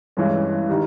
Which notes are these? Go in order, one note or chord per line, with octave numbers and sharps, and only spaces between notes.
G2 E3 G#3 C#4
D#3 G3